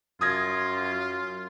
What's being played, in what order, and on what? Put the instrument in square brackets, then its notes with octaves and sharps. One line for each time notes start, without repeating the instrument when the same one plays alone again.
[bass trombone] F#2 [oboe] F4 [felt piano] D#6 G#6 A#6